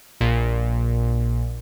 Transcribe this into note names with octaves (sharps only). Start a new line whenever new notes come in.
A#1 A#2